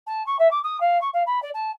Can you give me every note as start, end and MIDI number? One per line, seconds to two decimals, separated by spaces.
0.06 0.24 81
0.26 0.36 85
0.38 0.50 76
0.50 0.59 86
0.63 0.79 87
0.80 0.99 77
1.01 1.08 85
1.13 1.22 77
1.26 1.41 83
1.42 1.49 74
1.54 1.70 81